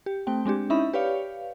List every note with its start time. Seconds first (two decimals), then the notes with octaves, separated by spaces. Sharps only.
0.06 G4
0.27 A3 C4 G5
0.45 G#3 C4 D4 G4
0.70 C#4 D#4 E4 E5 B5
0.93 G4 B4 C#5 D5 F5